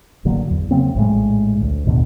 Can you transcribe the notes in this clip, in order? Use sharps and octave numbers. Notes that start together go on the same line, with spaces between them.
A1 D3 F#3 A#3
E2
C#3 F#3 A#3 C4
A#1 A2 G#3
D2
A1 D#2 B2 D3